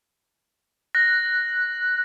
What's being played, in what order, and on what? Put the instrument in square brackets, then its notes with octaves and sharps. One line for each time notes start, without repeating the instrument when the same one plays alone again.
[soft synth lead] F#6 [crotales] A#6